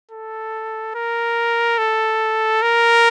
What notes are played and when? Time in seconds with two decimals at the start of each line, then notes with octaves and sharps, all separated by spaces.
0.11 A4
0.95 A#4
1.78 A4
2.62 A#4